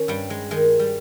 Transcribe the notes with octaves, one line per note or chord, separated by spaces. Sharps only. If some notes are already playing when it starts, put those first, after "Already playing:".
Already playing: D#3 C#4
G2 G3
G#3
D#3 G#3
G3